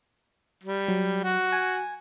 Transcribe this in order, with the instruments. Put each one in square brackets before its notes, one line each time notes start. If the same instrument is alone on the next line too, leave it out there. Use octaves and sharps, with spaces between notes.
[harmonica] G3
[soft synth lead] F#3
[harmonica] F#4
[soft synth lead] G#5